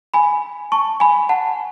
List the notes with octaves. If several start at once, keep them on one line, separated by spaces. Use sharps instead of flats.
G#5 B5
A5 C#6
G#5 B5
F#5 A5